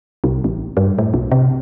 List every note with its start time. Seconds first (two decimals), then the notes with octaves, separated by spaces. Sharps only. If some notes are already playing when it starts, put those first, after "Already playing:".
0.24 C2
0.44 A1
0.77 G2
0.99 A2
1.14 B1
1.32 C3